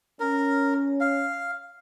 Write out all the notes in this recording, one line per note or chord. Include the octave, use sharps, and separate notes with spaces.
C#4 A#4
F5